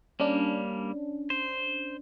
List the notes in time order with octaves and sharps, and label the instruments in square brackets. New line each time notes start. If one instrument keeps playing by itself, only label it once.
[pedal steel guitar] G3 A#3 [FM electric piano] C#4 D4
[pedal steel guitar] C5